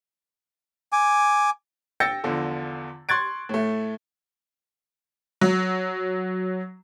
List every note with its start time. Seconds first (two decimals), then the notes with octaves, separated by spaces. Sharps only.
0.92 G#5 D6
2.00 G5 E6 G6 A6 A#6 C#7
2.24 E2 D3 F3
3.09 C6 C#6 F#6 G#6 A6 D7
3.49 A2 A3
5.41 F#3